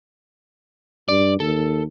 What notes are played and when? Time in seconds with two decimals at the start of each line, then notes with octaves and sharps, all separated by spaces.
1.08 G2 D5
1.40 D#2 A4